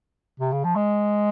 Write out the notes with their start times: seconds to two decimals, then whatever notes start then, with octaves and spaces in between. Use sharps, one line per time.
0.40 C3
0.52 C#3
0.64 F3
0.76 G#3